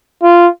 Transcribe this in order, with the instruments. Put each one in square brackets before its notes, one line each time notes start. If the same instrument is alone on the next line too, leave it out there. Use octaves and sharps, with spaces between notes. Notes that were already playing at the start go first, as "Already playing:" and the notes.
[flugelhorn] F4